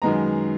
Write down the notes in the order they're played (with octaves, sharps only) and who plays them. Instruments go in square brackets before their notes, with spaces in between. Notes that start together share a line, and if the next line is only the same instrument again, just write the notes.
[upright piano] F#2 D#3 G#3 B3 A#5